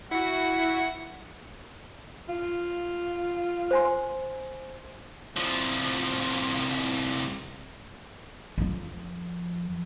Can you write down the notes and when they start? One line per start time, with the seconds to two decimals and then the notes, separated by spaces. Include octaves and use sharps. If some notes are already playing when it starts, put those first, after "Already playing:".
0.11 E4 F#4 F#5
2.29 F4
3.71 C5 G#5 C6
5.37 C2 F3
8.58 F2 F3